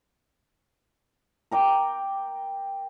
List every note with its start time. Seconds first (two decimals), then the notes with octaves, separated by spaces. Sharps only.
1.51 A#4 G5 D6